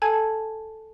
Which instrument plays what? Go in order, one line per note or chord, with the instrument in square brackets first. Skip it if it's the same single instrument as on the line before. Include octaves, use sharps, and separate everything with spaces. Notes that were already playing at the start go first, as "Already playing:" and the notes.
[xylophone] A4 G#5 A5 G#6